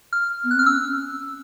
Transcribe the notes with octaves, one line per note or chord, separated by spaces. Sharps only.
F6
B3
F#6
C4 F6
C#4 E6